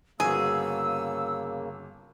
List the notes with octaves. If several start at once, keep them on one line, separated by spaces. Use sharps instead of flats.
G1 C#3 A#3 F#4 G#4 E6